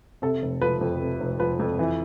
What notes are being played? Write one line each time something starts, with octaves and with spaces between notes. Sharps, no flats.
C3 A4
F1
F3 B4
F2
C3
F1
F3 B4
F2
E3